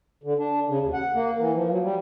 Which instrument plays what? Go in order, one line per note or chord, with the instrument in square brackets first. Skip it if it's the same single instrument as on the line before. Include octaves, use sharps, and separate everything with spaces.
[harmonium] D3
D4
C#3
D#2
F#5
A#3
E3
F3
F#3
G3